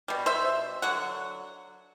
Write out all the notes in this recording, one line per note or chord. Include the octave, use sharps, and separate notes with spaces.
B2 G3
C5 E5
D3 F#3 F#5